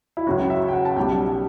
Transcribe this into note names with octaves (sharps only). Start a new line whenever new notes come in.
E4
C#2 C#3 F#3 F#4
E5
G5
F#5
A5
B1 B2 G3 G5